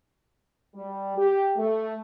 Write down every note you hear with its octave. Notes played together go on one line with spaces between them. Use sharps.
G3
G4
A3